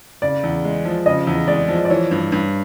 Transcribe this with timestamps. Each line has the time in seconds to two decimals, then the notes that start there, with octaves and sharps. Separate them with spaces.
0.22 C#3 D5
0.43 E2
0.64 G#3
0.85 F3
1.06 C#3 D#5
1.27 E2
1.48 G#3 D5
1.68 F3
1.85 D5
1.90 E3 C#5
2.11 G2
2.32 G2